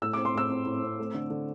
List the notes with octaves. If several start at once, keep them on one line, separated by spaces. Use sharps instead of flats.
A2 E6
D6
C4
C6
A2 E6
C4
A2
C4
A3
D3
D3